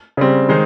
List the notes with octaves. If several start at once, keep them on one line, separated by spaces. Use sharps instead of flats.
C#3 G3 C4
D#3 G#3 D#4 G#4 C5